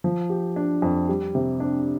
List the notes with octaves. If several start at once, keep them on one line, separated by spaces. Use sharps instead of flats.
F3
G4
D4
F2
G3
C3
D4